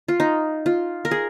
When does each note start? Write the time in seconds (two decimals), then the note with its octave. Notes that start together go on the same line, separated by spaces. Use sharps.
0.08 F4
0.20 D#4
0.66 F4
1.05 A#4
1.11 G#4